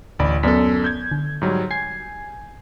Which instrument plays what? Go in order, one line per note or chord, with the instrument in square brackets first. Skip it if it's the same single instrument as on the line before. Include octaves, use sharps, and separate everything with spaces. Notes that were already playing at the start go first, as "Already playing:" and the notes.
[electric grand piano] A1 D5 B5 [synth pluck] D2 D3
[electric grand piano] F#2 A4 [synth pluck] B3 D5 B6
[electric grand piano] G6 G#6
[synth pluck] D3
[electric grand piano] G#2 F#3 G3
[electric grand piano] G#5 [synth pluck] G#6 C7